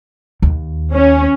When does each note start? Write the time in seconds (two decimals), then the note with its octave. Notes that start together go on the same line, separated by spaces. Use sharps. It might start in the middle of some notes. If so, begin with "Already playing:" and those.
0.42 D#2
0.93 C#4